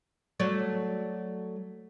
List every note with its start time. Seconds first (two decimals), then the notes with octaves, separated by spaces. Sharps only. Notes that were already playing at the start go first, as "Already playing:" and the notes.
0.40 F#3 A3 D5